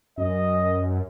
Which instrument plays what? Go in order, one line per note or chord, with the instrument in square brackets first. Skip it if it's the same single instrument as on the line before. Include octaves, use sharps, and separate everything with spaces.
[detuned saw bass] F#2 [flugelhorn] D#5